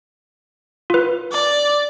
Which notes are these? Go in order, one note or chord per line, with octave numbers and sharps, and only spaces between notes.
F4 B4
D5